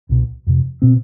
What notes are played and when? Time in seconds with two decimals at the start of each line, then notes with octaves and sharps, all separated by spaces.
0.09 C2 B2
0.47 F2 C3
0.82 B2 C4